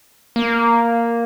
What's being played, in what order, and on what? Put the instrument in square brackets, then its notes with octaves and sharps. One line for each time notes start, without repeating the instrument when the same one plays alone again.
[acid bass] A#3